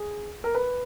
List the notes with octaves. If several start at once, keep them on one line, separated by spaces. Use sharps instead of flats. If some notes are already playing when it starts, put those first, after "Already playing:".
Already playing: G#4
A#4
B4